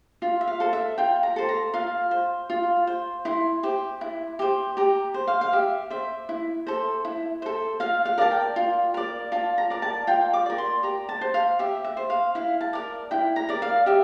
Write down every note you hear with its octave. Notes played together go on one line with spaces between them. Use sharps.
F4
E5
F5
A4 C5
E5
F4 G5
A#5
A4 C5
A#5
F4 F5
C5
F4
C5
E4 C6
G4 C5
E4
G4 C5
G4 A#5
C5
F5
F5
G4 E5
C5 E5
E4
A4 C5
E4
A4 C5
F4 F5
F5
A#4 D5 A5
G5
F4
A#4 D5
F4 A5
A#5
A#4 D5
A5
F4 G5
D6
A#4 D5
C6
G4 A#5
A5
C5
F5
G4 E5
E5
C5
F5
E4 F5
A5
A#4 D5
E4 G5
A#5
A#4 D5
F5
G4 E5